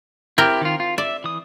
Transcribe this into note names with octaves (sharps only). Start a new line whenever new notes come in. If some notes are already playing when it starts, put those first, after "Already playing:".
C4 E4 G4 A#4 G5
D#3 F4
F4
D5 E5
E3 D#6